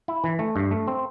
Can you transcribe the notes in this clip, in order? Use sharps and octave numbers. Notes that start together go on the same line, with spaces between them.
E4
E3
A3
G2
A3
C4